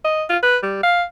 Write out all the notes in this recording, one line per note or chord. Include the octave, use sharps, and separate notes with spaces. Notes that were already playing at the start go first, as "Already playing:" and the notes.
D#5
F4
B4
G3
F5